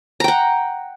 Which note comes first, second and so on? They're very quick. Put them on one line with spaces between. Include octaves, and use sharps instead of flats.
A#5 G5 F#5